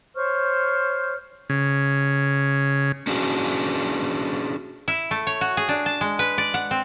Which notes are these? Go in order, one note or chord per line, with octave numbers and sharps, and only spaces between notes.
C5 C#5 C#6 F6
C#3
C#4 D4 F#4 G#4 C5
E4
A3
C#5
F#4
G#4
D4
A5
G#3
B4
D5
F#5
C4